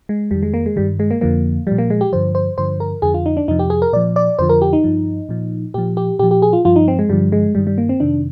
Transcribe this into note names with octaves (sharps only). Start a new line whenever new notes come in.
G#3
F2 D#3 G3
G#3
A#3
G#3
G2 D#3 G3
G#3
A#3
F2 D3 F3 A#3
A#2 F3 G3
A#3
G#3
G4
G2 D3 F3 C5
C5
G2 D3 F3 C5
A#4
F2 D3 F3 G#4
F4
D#4
D4
F2 C3 F3 D#4
G4
G#4
A#4
A#2 F3 D5
D5
F2 D3 F3 C5
A#4
G4
D#4
G2 F3
A#2 F3
A#2 F3 G4
G4
A#2 F3 G4
G4
G#4
F4
G2 F3 F4
D#4
C4
G#3
G2 D3 F3 G3
G#3
G2 D#3 G3
G3
A#3
C4
F2 C3 D#3 D4